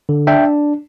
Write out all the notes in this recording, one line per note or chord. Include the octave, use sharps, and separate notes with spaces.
D3
D4 E5 G5